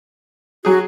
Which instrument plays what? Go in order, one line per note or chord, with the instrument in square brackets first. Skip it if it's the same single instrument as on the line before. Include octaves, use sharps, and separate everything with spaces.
[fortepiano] F#3 G#4 [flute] F#4